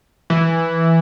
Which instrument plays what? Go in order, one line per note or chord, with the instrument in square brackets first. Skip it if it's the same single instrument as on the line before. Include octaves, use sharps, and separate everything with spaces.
[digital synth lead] E3